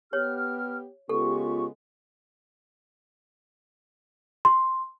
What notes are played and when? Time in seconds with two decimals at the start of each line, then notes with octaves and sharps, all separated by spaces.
0.13 B3 G4 C#5 F6
1.09 C#3 G#3 B3 F4 G4 A4 C#6
4.45 C6